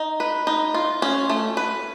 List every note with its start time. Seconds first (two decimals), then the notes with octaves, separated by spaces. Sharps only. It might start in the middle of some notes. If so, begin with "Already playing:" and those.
Already playing: D#4
0.20 B4
0.47 D#4
0.74 F4
1.02 C#4
1.30 A3
1.57 B4